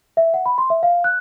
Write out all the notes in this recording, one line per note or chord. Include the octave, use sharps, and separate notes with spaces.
E5
F#5
B5
C6
E5
F5
F#6